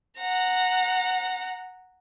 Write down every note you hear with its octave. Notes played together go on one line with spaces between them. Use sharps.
F#5 A#5